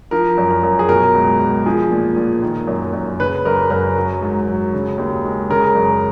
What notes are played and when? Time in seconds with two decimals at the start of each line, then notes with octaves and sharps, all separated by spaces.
0.11 F3 A#4
0.38 F#2
0.50 A#4
0.63 F#2
0.79 G#4
0.89 B2 A#4
1.15 C#2
1.40 C#2
1.66 F3 G#4
1.91 A#2
2.16 A#2
2.42 D#3
2.67 F#2
2.93 F#2
3.19 C#3 B4
3.46 F#2 A#4
3.70 F#2 A#4
3.97 F#3
4.21 G#2
4.48 F#3
4.74 C#3
4.98 D#2
5.24 G#3
5.50 C#3 A#4
5.75 F#2